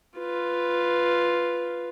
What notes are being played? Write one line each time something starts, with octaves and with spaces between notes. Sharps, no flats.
F4 B4